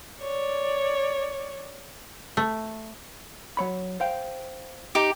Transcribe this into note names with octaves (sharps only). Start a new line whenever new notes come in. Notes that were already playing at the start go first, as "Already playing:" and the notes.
C#5 D5
A3
F#3 C#5 B5
C5 F5 G5
D#4 G4 D6